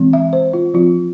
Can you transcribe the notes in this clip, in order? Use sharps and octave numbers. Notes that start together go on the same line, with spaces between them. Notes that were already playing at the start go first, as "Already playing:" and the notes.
Already playing: E3 G#3 C4
E5
C5
F4
F3 C4 F4